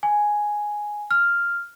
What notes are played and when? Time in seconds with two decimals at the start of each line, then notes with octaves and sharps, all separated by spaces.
0.03 G#5
1.11 F6